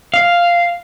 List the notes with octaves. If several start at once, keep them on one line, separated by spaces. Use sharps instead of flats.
F5